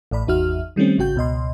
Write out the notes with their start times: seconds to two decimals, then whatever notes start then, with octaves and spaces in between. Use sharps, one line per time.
0.11 A1 A2 D5 B5
0.27 G#1 E2 D#4 F#4 E5 F6
0.76 D#3 G3 A3 C4 C#4
0.98 G#1 C#3 F#4 G5 G6
1.16 C#2 B2 D#5 C6